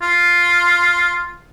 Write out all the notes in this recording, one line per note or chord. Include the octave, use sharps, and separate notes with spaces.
F4